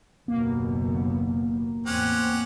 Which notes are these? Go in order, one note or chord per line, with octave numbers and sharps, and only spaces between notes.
F#1 D#2 B2 A#3
E2 A2 C4 C#4 G4 F#5